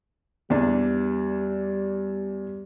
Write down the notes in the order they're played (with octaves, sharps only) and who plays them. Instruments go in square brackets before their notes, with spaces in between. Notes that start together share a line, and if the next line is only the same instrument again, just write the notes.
[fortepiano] E2 D4 [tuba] G3